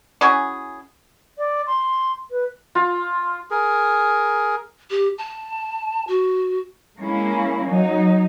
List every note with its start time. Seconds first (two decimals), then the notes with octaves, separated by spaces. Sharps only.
0.21 C#4 E4 F#4 G#4
1.38 D5
1.67 C6
2.31 B4
2.75 F4
3.51 G#4 A#4
4.90 G4
5.18 A5
6.08 F#4
6.99 G#3 A#3 C#4 E4
7.68 F#3 D#4